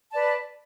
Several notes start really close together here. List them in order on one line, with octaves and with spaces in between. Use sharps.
A5 D5 B4